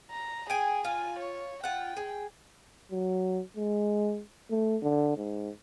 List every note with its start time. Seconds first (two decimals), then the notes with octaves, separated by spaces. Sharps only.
0.11 A#5
0.50 G#4 G5 G#5
0.85 F4 G#5
1.19 C#5
1.64 F4 F#5 G5
1.97 G#4
2.91 F#3
3.56 G#3
4.50 A3
4.82 D3
5.17 G#2